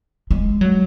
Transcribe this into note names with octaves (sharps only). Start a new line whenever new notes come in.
G#3
F#3